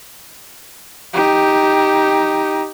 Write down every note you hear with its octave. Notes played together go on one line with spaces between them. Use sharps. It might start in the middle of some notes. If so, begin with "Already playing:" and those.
D#4 G4